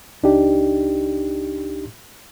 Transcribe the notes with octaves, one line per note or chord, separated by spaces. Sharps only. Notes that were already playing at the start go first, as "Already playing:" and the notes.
C#2 D4 D#4 G4